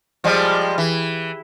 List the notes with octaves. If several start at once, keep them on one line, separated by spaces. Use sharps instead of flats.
F3 G3 G#3
E3